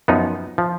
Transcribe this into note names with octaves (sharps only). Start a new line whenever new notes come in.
F#2 F3 B3 D#4
F3